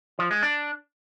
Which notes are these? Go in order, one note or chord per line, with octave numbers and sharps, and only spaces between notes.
F3
G#3
D4